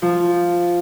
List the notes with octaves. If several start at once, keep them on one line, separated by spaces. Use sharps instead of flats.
F3